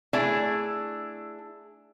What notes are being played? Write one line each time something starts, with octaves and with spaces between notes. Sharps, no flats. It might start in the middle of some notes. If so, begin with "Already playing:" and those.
A3 D4 E4 G#4